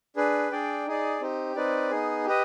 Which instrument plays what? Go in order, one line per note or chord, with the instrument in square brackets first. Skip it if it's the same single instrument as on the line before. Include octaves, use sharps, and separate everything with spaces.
[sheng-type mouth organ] D4 G#4 B4
D4 G#4 D5 G5
D#4 G#4 D5
C4 D#4 G4
C4 D#4 B4 D5
B3 D#4 G#4
G4 B4 D#5